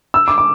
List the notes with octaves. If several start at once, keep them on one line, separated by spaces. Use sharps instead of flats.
E6
D6
D6